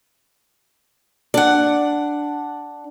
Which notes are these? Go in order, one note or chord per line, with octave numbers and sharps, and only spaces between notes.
D4 F#5